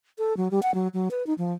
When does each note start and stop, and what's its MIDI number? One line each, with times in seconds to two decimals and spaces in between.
0.18 0.36 69
0.37 0.48 54
0.51 0.62 55
0.62 0.74 78
0.74 0.88 54
0.93 1.08 54
1.11 1.25 71
1.27 1.33 63
1.38 1.53 53